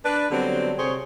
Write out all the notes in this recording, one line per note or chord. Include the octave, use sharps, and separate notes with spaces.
D4 B4
D3 F#3 G3 B3 C4
C3 G#4 C5 C#5